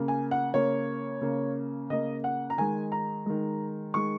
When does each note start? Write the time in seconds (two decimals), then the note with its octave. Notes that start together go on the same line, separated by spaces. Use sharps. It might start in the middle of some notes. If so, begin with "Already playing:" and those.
Already playing: C#3 A#3
0.08 G#5
0.31 F#5
0.54 C#3 A#3 C#5
1.21 C#3 A#3
1.90 C#3 A#3 D#5
2.24 F#5
2.50 A#5
2.58 D#3 G#3 G#5
2.92 A#5
3.26 D#3 G#3
3.94 D#3 G#3 C#6